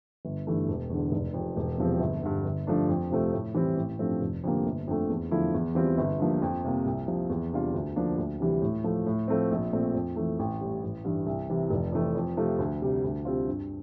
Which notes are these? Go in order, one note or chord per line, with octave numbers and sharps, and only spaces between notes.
G1
G2 E3 A3
E1
E2 D3
F1
F2 C3
E1
E2 C3 F3 C4
G1
G2 D3
G1
G2 F3 A3 D4
F2
C3 F3 A3 C4
A2
E3 G3 C4 E4
A1
G2 F3 A3 C4
F1
F2 D3 G3 A#3
G1
F2 D3 A3
E2
D3 F3 A3 E4
E2
E3 G3 C4 F4
G1
G2 F3 A#3
F2
C3 G3 A#3
C2
C3 F3
E2
C3 G3 D4 F4
D2
D3 F3 A#3 D4
D2
C3 E3 G3
A2
F3 A3
A2
F3 A3 C4
A#1
A#2 A3 C4
F2
E3 A3
A1
A2 G3
A1
G2 E3
C2
C3 E3
F1
F2 E3 A3
F2
C3 F3 A3
D2
C3 G3
D2
C3 G3 C4 F4
G2